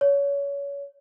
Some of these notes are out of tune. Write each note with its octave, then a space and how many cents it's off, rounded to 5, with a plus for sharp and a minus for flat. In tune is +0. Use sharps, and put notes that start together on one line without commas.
C#5 +25